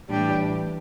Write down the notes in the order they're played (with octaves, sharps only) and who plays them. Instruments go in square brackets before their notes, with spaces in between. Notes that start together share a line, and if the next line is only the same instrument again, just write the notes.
[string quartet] A2 G3 D4 G4 [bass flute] E3